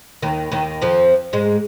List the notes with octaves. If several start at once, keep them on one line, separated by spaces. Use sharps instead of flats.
D#2 D#3
D#2 D#3
F2 F3
G#2 G#3